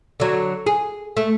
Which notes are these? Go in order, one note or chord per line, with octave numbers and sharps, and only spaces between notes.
D3 F#3
G#4
A3